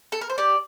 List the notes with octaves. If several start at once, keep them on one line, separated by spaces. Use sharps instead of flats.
A4
A#4
C5
G4 D5